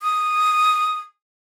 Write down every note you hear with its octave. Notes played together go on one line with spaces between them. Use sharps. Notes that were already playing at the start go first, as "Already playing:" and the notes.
D#6